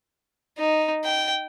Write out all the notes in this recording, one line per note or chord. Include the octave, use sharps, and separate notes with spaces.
D#4
G5